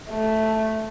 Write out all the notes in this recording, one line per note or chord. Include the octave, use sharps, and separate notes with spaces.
A3